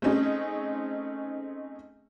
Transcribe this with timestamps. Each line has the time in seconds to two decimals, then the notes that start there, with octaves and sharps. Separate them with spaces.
0.02 A3 C4 C#4 D#4 G#4